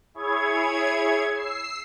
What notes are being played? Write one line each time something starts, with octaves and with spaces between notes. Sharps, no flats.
E4 G#4 C#5 G#6
E6 C7